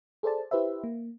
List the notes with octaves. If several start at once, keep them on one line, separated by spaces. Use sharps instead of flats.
G#4 A4 C5 D5 A5
E4 G4 B4 C5 E5
A#3